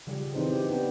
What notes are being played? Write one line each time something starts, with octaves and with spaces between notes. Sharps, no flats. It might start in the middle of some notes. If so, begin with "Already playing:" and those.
C#3 F3 G3 G4 G#4
E3 F3 C4 D#4 C5
G4
B3 D4